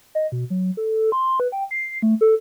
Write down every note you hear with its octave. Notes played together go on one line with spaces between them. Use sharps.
D#5
B2
F#3
A4
C6
B4
G5
C7
A3
A4